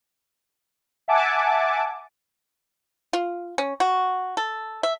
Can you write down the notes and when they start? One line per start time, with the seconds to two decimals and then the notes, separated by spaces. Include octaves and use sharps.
1.08 E5 F#5 G#5 A5 D6
3.13 F4
3.58 C#4
3.80 F#4
4.37 A4
4.83 E5